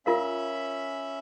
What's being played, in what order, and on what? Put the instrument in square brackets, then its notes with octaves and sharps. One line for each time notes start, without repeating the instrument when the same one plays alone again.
[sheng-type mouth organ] C#4 E5 B5 [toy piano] F4 A#4 F5